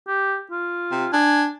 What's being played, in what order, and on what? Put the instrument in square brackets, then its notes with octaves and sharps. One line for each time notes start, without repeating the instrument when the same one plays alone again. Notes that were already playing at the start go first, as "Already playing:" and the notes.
[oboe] G4
F4
[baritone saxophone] C3
[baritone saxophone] D4 [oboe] G#5